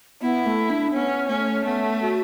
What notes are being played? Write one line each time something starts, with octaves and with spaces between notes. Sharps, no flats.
B3 E4
A3
D4
B3 C#4
A3 C#4
A3 B3
F#4